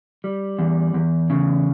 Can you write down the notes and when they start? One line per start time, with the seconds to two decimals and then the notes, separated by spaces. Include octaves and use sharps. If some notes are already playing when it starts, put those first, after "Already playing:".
0.24 G3
0.59 E2
0.94 E2
1.30 C#3